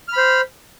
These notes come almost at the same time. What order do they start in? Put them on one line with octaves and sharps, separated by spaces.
F6 B5 C5